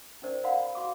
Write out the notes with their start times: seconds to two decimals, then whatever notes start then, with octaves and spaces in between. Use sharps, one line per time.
0.22 C#4 D#4 A#4 C5 D5
0.44 A#4 D5 F5 F#5 A#5 B5
0.75 F#4 F5 D6